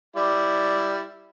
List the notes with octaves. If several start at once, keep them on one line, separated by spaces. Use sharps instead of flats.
G3 E4 D5